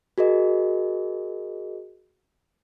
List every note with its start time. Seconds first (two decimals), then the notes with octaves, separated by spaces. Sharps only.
0.18 F#4 G#4 A#4 D#5